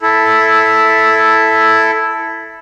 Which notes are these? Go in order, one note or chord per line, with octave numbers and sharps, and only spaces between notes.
E4 A4